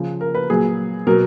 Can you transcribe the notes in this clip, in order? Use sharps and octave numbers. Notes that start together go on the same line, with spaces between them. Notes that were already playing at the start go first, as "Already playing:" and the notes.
Already playing: C#3 F3
A#4
B4
A#2 F#3 G#4
B2 F#3 A#4